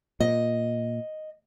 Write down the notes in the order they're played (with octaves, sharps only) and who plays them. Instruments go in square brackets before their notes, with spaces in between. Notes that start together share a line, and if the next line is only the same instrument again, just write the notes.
[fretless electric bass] A#2 [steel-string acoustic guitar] D#5